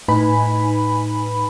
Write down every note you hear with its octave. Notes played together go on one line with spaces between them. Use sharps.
A2 D#4 B4 G#5 B5